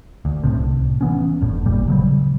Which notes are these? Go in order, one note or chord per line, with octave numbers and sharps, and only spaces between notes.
D2
D1 C2 A2 C3
E3 B3 C#4
F1 A#1 A2
D1 G#1 A#2 G3
C#3 F#3 G3